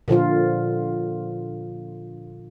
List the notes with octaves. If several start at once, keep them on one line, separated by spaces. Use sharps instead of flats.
A#2 D3 F3 F4